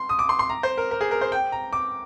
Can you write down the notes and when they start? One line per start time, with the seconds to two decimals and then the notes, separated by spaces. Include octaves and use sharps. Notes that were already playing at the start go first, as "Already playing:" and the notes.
Already playing: C6
0.09 D#6
0.19 D6
0.29 C6
0.39 C6
0.50 A#5
0.63 C5
0.78 A#4
0.91 A#4
1.01 G#4
1.11 A#4
1.21 C5
1.32 G5
1.52 A#5
1.73 D6